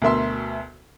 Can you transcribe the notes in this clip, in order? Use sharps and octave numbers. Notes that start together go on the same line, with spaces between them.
D2 B2 A#4 E5 C6